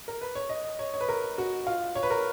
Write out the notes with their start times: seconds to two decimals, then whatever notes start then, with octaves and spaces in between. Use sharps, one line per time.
0.08 A#4
0.21 B4
0.35 C#5
0.49 D#5
0.79 C#5
0.94 C#5
1.01 B4
1.09 A#4
1.38 F#4
1.67 F4
1.95 C#5
2.03 B4
2.10 A#4